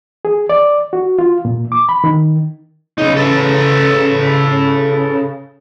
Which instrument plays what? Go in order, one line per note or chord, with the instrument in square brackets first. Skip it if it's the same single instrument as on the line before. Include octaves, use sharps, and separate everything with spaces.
[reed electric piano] G#4
D5
F#4
F4
A#2
D6
B5
D#3
[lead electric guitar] B1 D#4 [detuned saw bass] C#3
[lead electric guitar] A4 B4